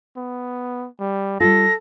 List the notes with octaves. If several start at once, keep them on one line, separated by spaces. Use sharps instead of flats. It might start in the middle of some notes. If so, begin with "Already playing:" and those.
B3
G3
G3 F4 A4 A#6